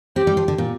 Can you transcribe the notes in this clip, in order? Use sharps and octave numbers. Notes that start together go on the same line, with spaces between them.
C4 G4
G3
F3
D3
A#2